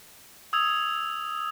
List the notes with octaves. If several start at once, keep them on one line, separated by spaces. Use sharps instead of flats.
D#6 E6 G#6 F7